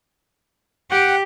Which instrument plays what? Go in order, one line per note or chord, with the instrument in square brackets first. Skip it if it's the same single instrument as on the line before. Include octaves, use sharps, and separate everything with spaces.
[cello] G4 [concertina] F#5 G5